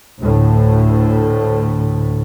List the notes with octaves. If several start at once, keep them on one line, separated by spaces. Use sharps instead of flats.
D2 A2